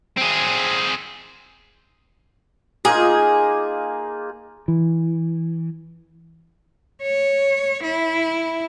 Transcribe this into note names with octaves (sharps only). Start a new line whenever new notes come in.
C4 G#4
A#3 D#4 F4 G#4
E3
C#5
E4